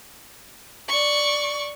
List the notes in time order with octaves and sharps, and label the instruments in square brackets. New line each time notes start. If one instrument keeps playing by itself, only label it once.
[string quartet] D5 C#6